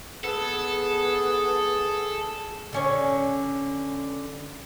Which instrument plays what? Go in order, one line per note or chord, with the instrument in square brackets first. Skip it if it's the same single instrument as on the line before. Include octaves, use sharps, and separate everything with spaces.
[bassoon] B3 [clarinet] G#4 [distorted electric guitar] A4
[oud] D3 C#4 C#5